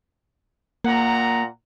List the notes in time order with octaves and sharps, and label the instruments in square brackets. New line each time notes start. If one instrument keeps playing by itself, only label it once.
[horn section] A#2 F#5 A#5 [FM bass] A#3